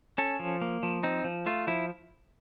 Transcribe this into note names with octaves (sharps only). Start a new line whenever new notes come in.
C#4 A4
F3
A#3
F3
C4 D#4
F3
A3 F4
F3 E4